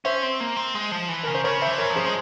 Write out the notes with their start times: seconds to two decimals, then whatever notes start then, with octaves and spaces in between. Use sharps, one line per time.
0.05 C#4 C5 E5
0.23 C4
0.40 A#3
0.57 C4
0.75 G#3
0.92 F3
1.09 E3
1.23 C#3 A#4
1.34 C5
1.44 C#3 A#4 C#5
1.62 C5 E5
1.67 E3
1.78 A#4 C#5
1.90 F3
1.96 G#4 C5
2.06 G#3